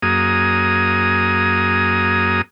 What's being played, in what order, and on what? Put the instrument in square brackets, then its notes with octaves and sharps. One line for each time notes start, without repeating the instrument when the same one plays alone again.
[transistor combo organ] F#2 A#3 G#4 D#6